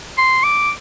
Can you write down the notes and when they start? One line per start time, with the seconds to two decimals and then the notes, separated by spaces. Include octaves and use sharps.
0.18 C6
0.44 D6